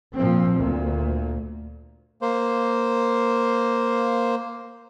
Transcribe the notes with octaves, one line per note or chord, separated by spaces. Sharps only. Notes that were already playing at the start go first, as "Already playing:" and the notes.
A#2 F3 C4
D2 A#2
A#3 C5